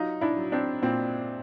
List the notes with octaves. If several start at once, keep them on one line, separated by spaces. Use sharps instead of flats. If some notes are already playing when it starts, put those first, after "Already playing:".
Already playing: F#3 D#4 F4
D4 E4
F#3
C4 D4
A#2 C4